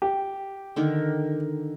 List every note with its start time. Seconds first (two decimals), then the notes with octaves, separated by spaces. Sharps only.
0.02 G4
0.76 D3 D#3 A#4